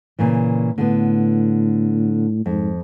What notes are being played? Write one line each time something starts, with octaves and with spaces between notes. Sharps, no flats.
A#2 C#3 E3
A2 D3 B3
F2 G#2